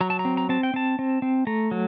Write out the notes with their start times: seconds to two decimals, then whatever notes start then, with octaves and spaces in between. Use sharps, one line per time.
0.01 F#3 A#5
0.10 A5
0.19 A#5
0.25 C4
0.37 A#5
0.49 C4 A5
0.63 G5
0.74 C4 A5
0.99 C4
1.22 C4
1.47 A3 A#5
1.71 F#3